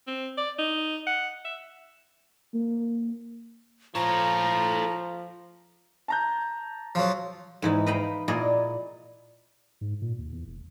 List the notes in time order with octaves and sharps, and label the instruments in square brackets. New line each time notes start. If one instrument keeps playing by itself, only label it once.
[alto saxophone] C4
D5
D#4
F#5
E5
[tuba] A#3
[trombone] F3 [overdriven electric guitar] A4 C#5 [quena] A#5
[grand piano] A5 A#5 G6
[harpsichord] F3 F#3
[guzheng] G#2 E3 D#4
B4 D#5 F5 G5 A#5 B5
A#2 E4 G#4 A#4 D5 D#5
[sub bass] G#2
A#2
D#2
E2
E1